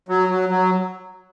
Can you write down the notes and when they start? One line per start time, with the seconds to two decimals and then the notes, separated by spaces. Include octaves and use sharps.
0.09 F#3
0.29 F#3
0.49 F#3